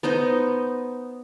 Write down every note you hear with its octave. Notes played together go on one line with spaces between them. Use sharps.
B3 D#4 C5 D#5